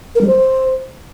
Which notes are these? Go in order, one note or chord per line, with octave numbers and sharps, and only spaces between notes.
A#4
G3
C5